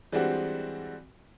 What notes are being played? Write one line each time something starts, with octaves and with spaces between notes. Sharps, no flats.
E3 G3 G#3 C4 D4 F#4